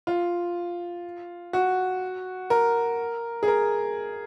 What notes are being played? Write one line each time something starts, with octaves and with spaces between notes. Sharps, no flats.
F4
F#4
A#4
G#4
A#4